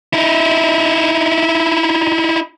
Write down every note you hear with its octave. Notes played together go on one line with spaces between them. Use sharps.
D#4 E4